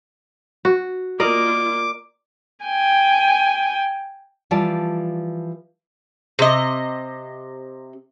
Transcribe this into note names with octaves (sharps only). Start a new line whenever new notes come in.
F#4
A#3 F4 A#4 D5 D#5 D6
G5 G#5
E3 F3 G3 F4 D5 A5
C3 D#5